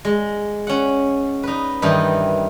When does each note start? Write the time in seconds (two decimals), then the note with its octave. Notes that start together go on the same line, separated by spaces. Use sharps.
0.05 G#3
0.67 C#4 F#5
1.43 D#4 B4
1.82 G2 D#3 E3 D#4